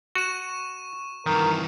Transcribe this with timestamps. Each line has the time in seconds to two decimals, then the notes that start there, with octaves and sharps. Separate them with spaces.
0.15 F#4 C#6 E7
1.26 G2 D#3 E3 A#4